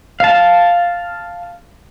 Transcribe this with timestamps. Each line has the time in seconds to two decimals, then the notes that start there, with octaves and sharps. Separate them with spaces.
0.20 F5 A5